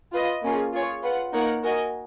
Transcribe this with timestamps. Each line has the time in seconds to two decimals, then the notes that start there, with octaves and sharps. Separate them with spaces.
0.13 F4 B4 D#5
0.43 A#3 C#4 F4 G#4
0.73 F4 G#4 C#5
1.03 F4 B4 F#5
1.33 A#3 D#4 A#4 C#5 F#5
1.63 F#4 A#4 D#5 G#5